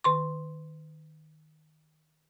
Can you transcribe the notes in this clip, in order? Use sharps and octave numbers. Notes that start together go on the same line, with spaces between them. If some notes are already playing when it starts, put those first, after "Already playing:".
D#3 C6 C#6